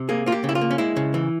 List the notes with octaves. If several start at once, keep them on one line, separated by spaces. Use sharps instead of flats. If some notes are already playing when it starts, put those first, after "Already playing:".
Already playing: C3
A#3 G#4
A#3 F4
G4
C#3
E4
F4
A#3
C#4
G#3 E4
C#3
E3